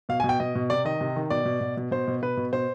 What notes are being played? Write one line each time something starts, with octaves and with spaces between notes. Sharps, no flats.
B2 F5
G#5
B2
G5
B2 D#5
B2
C3 D5
D#3 D#5
C3
D#3
B2 D5
B2
B2
B2
B2 C5
B2
B2 B4
B2
B2 C5